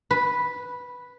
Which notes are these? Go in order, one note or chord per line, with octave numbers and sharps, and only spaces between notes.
B4